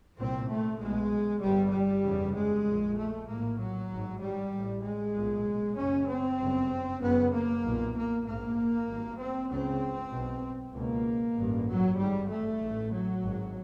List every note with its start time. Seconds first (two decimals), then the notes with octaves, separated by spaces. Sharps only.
0.18 C2 A#2 C4
0.48 A3
0.79 B1 B2 G#3
1.42 G1 G2 G3
1.73 G3
2.04 F1 E2 C#3
2.35 G#3
2.66 A#1 A#2
2.97 A3
3.28 A#1 A2 A#3
3.59 F#3
3.90 G#1 G#2
4.21 G3
4.52 A1
4.57 A2
4.84 G#3
5.15 B1 A#2
5.76 F#1 F#2 C#3 C#4
6.07 C4
6.38 G1 F#2 C#3
7.00 F#1 F#2 C#3 B3
7.32 A#3
7.63 B1 A#2
7.95 A#3
8.25 A#1 G#2 A#3
8.87 G#1 G2
9.19 C4
9.49 C#2 C#3 C4
10.11 B1 B2
10.73 C#2 B2 A#3
11.36 A1 G2
11.67 F#3
11.98 G#1 G#2 G3
12.28 A3
12.60 A1 A2
12.91 F#3
13.22 G#1 G#2